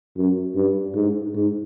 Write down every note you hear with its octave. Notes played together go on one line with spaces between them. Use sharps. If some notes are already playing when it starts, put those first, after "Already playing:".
F#2
G2
G#2
G#2